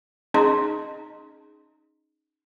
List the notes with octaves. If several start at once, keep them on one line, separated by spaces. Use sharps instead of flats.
C#4 D#4 G#4 D#5 A#5 C6